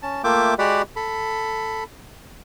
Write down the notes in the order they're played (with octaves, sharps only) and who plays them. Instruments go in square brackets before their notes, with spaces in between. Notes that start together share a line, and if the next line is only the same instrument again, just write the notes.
[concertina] C#4 A5
A3 A#3 F4 E5 G5 D6
G#3 F#4 G4 D5 F#5 B5
A4 B5